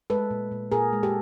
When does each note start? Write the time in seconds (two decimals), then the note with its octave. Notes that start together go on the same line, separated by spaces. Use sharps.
0.10 G#3 A4 B4
0.31 A#2
0.52 A#2
0.72 A#2 G#4 A#4
0.93 G#3
1.03 G4 A4